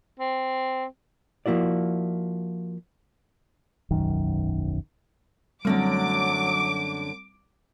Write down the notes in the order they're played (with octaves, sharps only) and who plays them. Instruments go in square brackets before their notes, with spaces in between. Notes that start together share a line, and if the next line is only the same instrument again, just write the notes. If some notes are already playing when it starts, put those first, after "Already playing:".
[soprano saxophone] C4
[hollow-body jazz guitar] F3 A#3 E4 F#4 D5
[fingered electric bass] E1 B1 F#2 D#3
[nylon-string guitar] F#2 D3 A3 [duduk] F#3 [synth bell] G3 C4 [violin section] D6